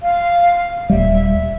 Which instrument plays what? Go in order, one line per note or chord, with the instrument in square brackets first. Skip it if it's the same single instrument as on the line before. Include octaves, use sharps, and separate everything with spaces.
[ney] F5
[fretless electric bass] D#1 G3 [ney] E5